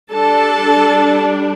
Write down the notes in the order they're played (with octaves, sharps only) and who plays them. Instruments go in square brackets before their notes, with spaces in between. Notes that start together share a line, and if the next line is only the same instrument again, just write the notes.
[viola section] G3 D4 A4 A5